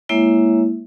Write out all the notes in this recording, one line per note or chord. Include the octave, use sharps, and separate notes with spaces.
G#3 A#3 E4 C#5 E5